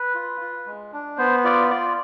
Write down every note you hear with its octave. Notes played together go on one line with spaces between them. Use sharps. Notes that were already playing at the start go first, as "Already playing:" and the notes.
Already playing: B4
F4
F4
G#3
D4
B3 C5
F4 D5
F4 D5